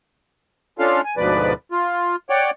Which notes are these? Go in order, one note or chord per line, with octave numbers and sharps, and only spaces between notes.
C#4 D4 F4 A4 F5
G#5
D2 G#2 B2 F3 B4 D5
F4
C#5 D5 F#5 G5